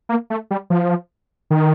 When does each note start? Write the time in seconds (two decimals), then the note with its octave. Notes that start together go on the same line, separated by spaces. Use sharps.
0.09 A#3
0.30 A3
0.51 G3
0.70 F3
1.51 D#3